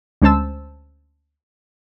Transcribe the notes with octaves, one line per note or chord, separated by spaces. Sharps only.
D2 G#3 C#4 C5 A5 E6